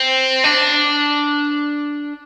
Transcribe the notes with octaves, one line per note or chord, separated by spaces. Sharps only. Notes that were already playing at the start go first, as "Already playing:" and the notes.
Already playing: C4
D4